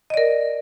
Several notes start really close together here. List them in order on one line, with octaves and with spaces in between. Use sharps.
D#5 D5 A#4